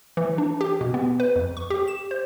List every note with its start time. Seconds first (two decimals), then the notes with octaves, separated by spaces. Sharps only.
0.17 E3
0.38 D4
0.61 G4
0.81 B2
0.94 B3
1.20 B4
1.36 F2
1.57 C#6
1.70 G4
1.88 E7
2.11 C5